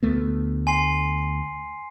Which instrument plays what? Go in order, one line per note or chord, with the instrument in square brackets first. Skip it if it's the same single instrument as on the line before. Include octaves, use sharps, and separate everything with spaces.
[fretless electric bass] D2 A3 B3
[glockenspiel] G#5 C6 C7